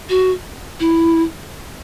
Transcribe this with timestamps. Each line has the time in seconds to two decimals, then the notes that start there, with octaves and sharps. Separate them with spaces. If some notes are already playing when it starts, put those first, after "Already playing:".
0.09 F#4
0.80 E4